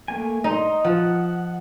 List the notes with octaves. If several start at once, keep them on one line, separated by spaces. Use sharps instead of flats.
A3 A#3 G#5
D#4 D#5 C6
F3 F#5